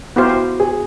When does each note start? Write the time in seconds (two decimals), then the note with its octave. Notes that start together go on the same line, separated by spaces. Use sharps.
0.16 B3 E4 F#4 G4 C5 F5
0.60 G#4